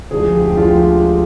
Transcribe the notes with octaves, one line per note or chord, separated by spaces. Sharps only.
D2 D3 F3 G#3 G#4
G4
G4
D2 D3 F3 G#3 F4
G4